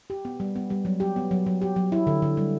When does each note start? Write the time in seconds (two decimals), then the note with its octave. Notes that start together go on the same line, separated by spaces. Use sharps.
0.10 G4
0.25 B3
0.40 G3
0.56 B3
0.70 G3
0.85 F#3
1.00 G4
1.16 B3
1.31 F#3
1.46 F#3
1.62 G4
1.76 F#3
1.92 E4
2.07 D3
2.22 D3
2.37 G3